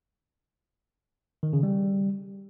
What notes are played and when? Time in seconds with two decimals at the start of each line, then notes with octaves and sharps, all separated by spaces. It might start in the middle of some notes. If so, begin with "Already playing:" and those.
1.43 D#3
1.53 C#3
1.63 G3